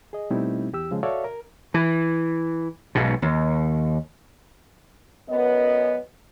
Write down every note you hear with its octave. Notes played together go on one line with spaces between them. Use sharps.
G#4 D#5
B2 G3 A3 C4 D#4 E4
E2 G4 E6
C#3 F3 G#3
F#4 A4 C#5 D5 E5 F5
A#4
E3
B1 G#2 B2
D#2
F#2 B3 D#5